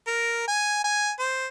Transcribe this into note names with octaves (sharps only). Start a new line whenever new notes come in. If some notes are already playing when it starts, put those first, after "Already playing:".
A#4
G#5
G#5
C5